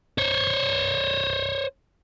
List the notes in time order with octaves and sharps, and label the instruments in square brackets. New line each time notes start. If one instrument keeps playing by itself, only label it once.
[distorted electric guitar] C5 C#5